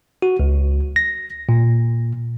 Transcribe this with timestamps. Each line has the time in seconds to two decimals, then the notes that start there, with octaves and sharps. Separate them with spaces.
0.22 F#4
0.40 C#2
0.96 A#6
1.49 A#2